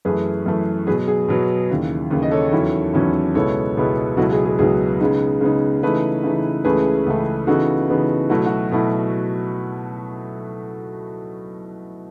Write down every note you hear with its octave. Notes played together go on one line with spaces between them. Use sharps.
F#2 E3 A3 G#4 B4
F#2 E3 A3
B2 F#3 B3 G#4 B4
G#4
B2 F#3 B3
D#2 C#3 E3
D#2 C#3 E3
D#5
A4 C#5
E2 D#3 F#3 C#4 E4
E2 D#3 F#3 C#4 E4
C#2 B2 G#3 B3 E4 A4 C#5
C#2 B2 G#3 B3 E4
C#2 B2 F#3 B3 E4 F#4 A4
G#4
G#4
C#2 B2 F#3 B3 E4 G#4
C#3 G#3 B3 D#4
C#3 G#3 B3 D#4
C#3 E3 A3 D#4 G#4 B4
C#3 E3 A3 D#4
C#2 C#3 E3 A3 G#4 B4
C#2 C#3 E3 A3
C#3 E3 B3 D#4 F#4 A4
C#3 E3 B3 D#4
B2 F#3 A3 E4 F#4
F#4
B2 F#3 A3 E4